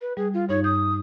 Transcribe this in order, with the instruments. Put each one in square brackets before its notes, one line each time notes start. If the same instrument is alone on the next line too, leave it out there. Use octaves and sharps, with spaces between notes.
[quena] B4
[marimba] G3 [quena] G#4
[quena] F4
[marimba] G2 D#4 G#6 [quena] C#5
[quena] D#6 [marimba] G6